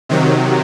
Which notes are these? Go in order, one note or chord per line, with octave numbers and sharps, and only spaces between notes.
C3 D#3 F#3